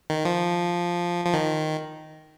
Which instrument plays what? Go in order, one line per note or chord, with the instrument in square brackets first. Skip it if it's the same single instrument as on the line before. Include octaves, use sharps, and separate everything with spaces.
[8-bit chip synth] D#3
F3
F3
D#3